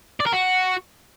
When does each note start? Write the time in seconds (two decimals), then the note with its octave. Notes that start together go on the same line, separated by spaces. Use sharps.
0.20 D5
0.26 A#4
0.33 F#4